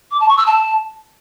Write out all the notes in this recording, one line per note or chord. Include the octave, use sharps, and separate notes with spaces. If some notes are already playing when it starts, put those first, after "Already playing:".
D6
A5
C#6
E6
A5